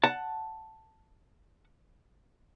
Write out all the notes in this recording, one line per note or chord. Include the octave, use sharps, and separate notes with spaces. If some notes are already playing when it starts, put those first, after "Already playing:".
F#5 A5